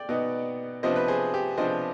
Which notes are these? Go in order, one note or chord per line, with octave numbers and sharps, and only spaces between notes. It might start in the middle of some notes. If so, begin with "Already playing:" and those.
Already playing: D5 G5
B2 B3 D#4
C3 F3 B3 D4 C5 D#5
B4
G#4 C5
G4
C3 F3 B3 D4 C5 D#5